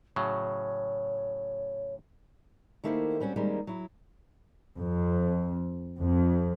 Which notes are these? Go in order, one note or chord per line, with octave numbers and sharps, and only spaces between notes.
A2 C#3 F#3 C#5
D#3 A3 A#3 E4 G4 C5
G3 C4 C#4 F#4
D#3 G3 G#3 A#3 C4 C#4
F#3 E4
F2
F2